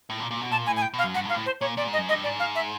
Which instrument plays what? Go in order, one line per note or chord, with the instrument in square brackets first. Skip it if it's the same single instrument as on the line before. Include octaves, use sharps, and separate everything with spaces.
[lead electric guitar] A2
A#2
A#2
B2
[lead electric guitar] A#2 [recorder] A5
[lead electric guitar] A2 [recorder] G#5
[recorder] G#5
G5
[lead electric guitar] B2 [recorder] F5
[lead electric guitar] F#2
[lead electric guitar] G2 [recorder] F#5
[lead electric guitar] G#2 [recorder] F5
[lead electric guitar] A2
[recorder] C5
[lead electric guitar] A#2 [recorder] C#5
[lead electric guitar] A#2 [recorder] D5
[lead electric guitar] G#2
[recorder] D#5
[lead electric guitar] F#2
[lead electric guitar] G2 [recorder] D#5
[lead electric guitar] G#2 [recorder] D5
[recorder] F5
E5